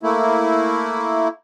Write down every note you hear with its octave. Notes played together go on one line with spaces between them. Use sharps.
A3 A#3 E4